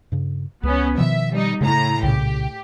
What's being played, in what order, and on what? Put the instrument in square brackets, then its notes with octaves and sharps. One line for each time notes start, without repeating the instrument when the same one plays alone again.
[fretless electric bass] G2 C#3
[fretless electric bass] C#2 [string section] B3 C#4
[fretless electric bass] B2 D#3 F3 [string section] E5
[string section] G3 D#4
[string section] A2 A#5 [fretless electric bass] C#3
[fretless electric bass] C2 A#2 C#3 [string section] G4